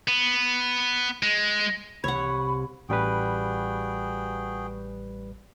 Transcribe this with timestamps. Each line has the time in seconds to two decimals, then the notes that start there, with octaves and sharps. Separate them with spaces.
0.08 B3
1.23 G#3
2.04 C2 C#5 F#5 B5
2.89 A1 G3 F#4 G#4 B4 G5